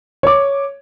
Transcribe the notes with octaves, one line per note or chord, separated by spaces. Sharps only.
C#5 D6